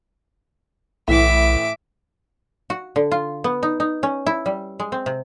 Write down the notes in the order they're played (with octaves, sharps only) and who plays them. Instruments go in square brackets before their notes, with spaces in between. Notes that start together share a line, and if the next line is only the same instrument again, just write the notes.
[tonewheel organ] B1 [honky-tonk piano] A2 E3 [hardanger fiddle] E5 D6
[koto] F#4
D3
F4
B3
D#4
D#4
C#4
E4
G3
G#3
C4
C3